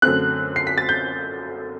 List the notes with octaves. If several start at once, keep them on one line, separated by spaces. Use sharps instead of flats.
F#2 D3 A3 C4 F#6
C7
B6
A6
G6